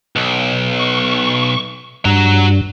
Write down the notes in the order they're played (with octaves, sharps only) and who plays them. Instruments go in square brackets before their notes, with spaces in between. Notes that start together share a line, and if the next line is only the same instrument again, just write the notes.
[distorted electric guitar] B1
[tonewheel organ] C#6
[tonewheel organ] G2 [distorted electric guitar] F#4 A#5